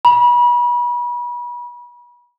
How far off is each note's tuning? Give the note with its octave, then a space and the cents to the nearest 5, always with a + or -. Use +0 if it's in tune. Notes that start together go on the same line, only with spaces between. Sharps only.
B5 -35